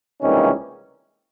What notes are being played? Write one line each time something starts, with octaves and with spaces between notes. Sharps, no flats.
C#2 C3 E3 G3 A#3 C#4 D#4